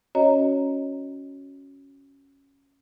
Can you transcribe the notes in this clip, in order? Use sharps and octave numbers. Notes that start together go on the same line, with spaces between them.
C#4 F#4 C#5 D#5 A#5